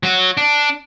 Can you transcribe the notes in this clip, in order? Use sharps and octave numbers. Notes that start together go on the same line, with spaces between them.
F#3 F#4
D4